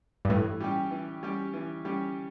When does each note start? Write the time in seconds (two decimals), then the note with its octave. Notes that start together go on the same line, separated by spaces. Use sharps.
0.25 G2
0.29 A2 E3
0.60 G3 C#4 G4
0.91 E3
1.23 G3 C#4 G4
1.54 E3
1.85 G3 C#4 G4